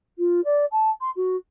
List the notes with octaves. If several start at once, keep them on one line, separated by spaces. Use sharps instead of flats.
F4
D5
A5
C6
F#4